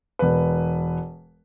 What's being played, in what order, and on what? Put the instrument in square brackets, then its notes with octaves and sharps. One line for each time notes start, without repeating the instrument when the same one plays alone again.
[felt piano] E1 B4